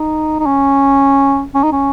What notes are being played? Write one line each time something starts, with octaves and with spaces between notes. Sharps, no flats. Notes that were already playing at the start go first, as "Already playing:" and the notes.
Already playing: D#4
D#4
C#4
C#4
D#4
C#4